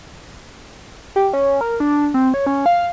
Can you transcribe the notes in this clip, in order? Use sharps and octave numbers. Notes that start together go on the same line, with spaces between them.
G4
C#4
A#4
D4
C4
C#5
C#4
F5